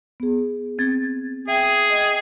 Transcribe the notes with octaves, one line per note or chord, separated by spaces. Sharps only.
B3 G#4
C4 G#6 A6
G#4 E5 G5
D#5 G5